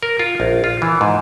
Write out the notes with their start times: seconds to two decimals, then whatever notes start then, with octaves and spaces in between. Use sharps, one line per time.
0.03 A#4
0.19 F4
0.40 A#1
0.64 F4
0.82 E3
1.01 G#2